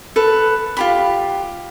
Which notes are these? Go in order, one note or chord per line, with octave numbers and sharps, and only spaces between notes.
A4 B4
F4 G4 B5